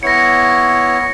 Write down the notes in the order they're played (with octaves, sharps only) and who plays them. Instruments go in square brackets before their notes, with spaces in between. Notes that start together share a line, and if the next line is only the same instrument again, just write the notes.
[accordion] B3 E4 C#5 [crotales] A#6 C#7